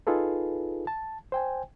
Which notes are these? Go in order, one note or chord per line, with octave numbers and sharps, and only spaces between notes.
D#4 F4 G#4 A4 B4
A5
C5 G5 G#5